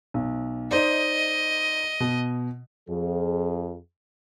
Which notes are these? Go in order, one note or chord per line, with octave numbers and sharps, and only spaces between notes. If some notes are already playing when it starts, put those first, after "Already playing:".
B1
D#4 C5 D5 D#5
B2
F2 F3 G#4